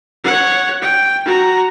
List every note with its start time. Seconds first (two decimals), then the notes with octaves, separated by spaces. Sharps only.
0.24 C#5 F#5
0.82 G5
1.25 F#4 A#5